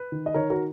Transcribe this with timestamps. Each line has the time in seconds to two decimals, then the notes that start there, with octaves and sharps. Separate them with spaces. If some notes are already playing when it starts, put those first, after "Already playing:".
Already playing: B4
0.12 D#3
0.26 D#5
0.34 D#3 A#4 C#5
0.50 F#4 A#4